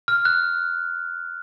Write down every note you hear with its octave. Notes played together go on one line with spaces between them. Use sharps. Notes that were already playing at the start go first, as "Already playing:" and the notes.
F6
F#6